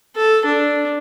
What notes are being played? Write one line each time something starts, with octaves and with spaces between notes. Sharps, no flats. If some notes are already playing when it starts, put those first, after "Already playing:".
A4
D4